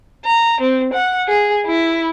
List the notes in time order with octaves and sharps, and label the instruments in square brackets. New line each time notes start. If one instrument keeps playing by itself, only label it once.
[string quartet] A#5
C4
F#5
G#4
E4